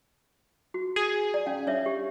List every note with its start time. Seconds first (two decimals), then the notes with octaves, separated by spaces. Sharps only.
0.74 F#4
0.96 G#4
1.34 D5
1.46 C#4 F5
1.67 D4 C#5 E5
1.86 G4